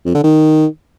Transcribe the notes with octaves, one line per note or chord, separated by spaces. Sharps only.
F2
D3
D#3